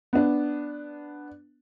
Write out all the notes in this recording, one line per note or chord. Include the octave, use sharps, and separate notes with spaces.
B3 D4